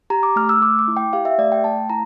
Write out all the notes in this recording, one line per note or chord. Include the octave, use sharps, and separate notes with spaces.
G4 A#5
D6
A3 F6
E6
A3 D6
D6
E4
G5
G4 F5
E5
A3 D5
G5
A3 A5
E4 A#5